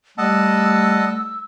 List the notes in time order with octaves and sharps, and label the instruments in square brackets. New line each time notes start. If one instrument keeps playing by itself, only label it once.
[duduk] G3 [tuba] A3 [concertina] D#5 F#5 A5 [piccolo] E6